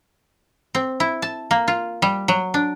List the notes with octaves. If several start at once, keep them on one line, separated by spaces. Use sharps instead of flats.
C4
E4
A5
A#3
F4
G3
F#3
D4